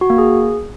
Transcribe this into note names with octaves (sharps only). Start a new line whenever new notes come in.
F#4
A#3
G#4